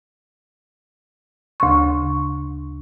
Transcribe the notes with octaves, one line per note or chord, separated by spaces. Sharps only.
D2 C#3 C6 C#6